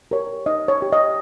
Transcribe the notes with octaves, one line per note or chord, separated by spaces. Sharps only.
G4 A#4 C#5
D#4 D#5
C#5
G4 C#5
D#5